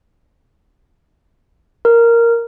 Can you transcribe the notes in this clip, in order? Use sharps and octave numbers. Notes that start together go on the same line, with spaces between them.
A#4